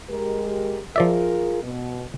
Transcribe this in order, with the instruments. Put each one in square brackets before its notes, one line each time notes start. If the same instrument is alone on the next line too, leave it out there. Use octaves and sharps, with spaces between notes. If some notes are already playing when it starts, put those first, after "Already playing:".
[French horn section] G#3 G4 A#4
[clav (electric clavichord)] F3 D5 E5 [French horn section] F4 G#4 A#4
[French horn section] B2